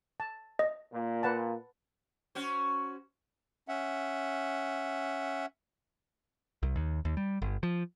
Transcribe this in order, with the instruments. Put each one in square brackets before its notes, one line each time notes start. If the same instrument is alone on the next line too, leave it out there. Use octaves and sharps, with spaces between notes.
[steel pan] A5
[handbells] D#5
[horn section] A#2
[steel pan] B4 F#5 A5
[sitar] C#4 F#4 C5
[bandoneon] C#4 E5 F#5
[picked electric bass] C2
D#2
D#2
G3
G1
F3